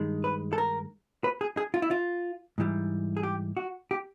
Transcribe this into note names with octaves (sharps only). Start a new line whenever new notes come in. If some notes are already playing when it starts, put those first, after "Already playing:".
Already playing: G2 D#3 G#3
B4
A4
A#4
B4
G#4
G#4
F4
E4
F4
G#2 E3 G3
G#4
G4
F#4
G4